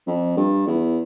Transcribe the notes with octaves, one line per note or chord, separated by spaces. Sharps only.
F2
G2
E2